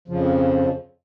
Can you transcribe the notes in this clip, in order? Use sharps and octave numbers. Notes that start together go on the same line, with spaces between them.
F2 C#3 F3